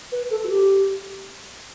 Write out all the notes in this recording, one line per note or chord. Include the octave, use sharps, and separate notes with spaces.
B4
A4
F#4
G4